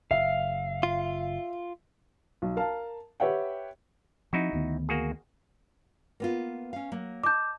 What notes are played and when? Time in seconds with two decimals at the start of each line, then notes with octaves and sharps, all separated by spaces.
0.11 F#1 E5 F5
0.83 F4
2.42 B1
2.57 A#4 F5 A5
3.20 G4 B4 C#5 E5 F#5 G5
4.33 F3 C4 D#4 E4 F#4
4.53 D2 D#3 B3
4.89 A#3 F#4 G#4
6.20 A#3 B3 F4
6.73 C#4 F5
6.92 F#3 A#3
7.23 D#5 A5 D6 G6